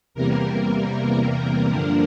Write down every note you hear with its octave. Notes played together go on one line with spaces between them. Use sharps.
E2 C3 E3 G3 A#3 A#4
A#4
G2 D3 F3 A#3 D4